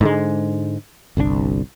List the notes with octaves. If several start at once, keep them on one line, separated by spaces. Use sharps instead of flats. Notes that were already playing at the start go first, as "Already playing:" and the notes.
G#2 D3 G#3
G1 C2 B2 D4